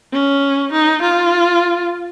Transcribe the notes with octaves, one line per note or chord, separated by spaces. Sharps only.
C#4
D#4
F4